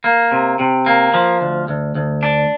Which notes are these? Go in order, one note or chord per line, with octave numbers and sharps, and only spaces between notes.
A#3
C3
C3
A#3
F3
D2
D2
D2
D4